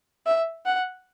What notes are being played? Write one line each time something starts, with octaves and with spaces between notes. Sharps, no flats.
E5
F#5